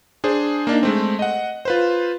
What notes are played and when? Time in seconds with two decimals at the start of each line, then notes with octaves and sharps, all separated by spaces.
0.24 D4 G#4 C5
0.67 A#3 D4 D#4
0.83 G#3 A3 C4
1.19 D#5 F#5
1.65 F4 B4 C5